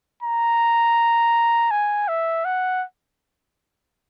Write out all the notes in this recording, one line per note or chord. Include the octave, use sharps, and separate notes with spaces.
A#5
G#5
E5
F#5